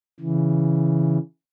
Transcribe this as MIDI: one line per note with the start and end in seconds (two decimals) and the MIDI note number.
0.20 1.18 49
0.20 1.18 52